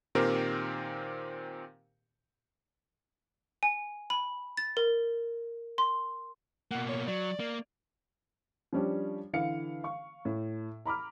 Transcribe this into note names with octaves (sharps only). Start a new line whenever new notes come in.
A#2 D#3 C4 G4 A#4 C5
G#5
B5
A6
A#4
C6
B2 A#3 F#5
C#5
F#3 D5
A#3
F3 G3 C#4 D4 G4
D3 E3 F5 C#7
F5 C#6
A2
A#5 B5 D6 F6